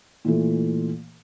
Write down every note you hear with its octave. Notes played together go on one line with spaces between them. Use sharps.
A#2 E3 A3